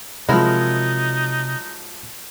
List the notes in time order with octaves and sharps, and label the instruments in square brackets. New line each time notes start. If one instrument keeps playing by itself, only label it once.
[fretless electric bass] C3 [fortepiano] F3 G#3 [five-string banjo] F#3 E4 A#4 [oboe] D#4